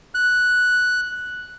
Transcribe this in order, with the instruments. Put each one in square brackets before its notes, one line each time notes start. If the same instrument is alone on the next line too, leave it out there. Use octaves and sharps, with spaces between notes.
[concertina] F#6